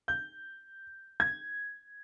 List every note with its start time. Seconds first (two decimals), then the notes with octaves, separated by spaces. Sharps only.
0.08 G6
1.20 G#6